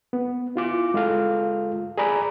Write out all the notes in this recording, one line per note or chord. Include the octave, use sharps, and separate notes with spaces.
B3
E4 F4 D6
G#3 F4 A4 F5
G#4 D5 A#5 B5